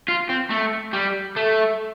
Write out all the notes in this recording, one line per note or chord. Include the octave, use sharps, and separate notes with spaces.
F4
C4
A3
G3
A3